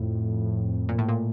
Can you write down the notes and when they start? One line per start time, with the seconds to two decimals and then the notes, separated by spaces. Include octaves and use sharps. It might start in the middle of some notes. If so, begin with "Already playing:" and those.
Already playing: F2 A2
0.89 A#2
0.98 A2
1.09 A#2